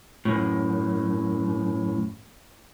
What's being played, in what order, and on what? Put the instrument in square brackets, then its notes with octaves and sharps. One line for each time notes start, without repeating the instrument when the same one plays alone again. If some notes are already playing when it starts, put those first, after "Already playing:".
[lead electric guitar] F#2 A2